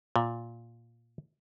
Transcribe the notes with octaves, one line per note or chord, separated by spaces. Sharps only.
A#2